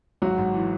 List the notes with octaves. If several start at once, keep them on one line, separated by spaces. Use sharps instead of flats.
G#1 F#3 F#4
G#2
E3